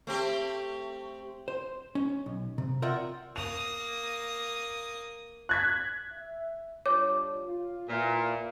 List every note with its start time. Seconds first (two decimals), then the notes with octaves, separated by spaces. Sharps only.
0.07 A3 C4 G4
1.48 C5
1.95 C#4
2.26 B1
2.58 C3
2.82 F4 A#4 D5 E5 F#5 G5
3.36 A#3 D#6 F7
5.49 F#6 G#6 B6
6.11 E5
6.86 G3 D4 F4 C#5 D6
7.43 F4
7.89 A#2 E4 B4 E5